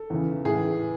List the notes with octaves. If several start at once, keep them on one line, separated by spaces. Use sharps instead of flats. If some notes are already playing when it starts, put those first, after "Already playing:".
Already playing: A4
E2 C#3 E3
A2 E3 G#4